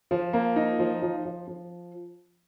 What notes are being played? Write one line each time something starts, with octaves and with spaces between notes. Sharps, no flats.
F3
A#3
D#4
F3
F3
F3
F3